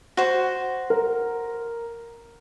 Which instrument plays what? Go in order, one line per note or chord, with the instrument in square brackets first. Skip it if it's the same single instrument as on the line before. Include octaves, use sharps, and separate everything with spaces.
[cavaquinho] F#4 C5
[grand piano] A#4